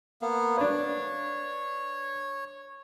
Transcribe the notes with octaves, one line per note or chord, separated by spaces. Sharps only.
A#3 B3
D4 B4 C#5